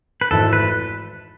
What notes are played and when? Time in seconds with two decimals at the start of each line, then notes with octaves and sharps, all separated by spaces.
0.21 B4
0.31 G#1 G#2 E3 A3 A4
0.53 B4